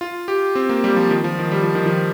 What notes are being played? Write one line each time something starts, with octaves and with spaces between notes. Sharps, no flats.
F4
G4
C4
A#3
G3
F3
D#3
F3
D#3
G3
F3
D#3
F3